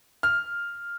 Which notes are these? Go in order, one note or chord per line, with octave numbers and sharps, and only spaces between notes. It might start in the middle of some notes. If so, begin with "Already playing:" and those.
F6